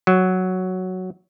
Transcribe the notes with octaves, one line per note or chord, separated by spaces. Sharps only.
F#3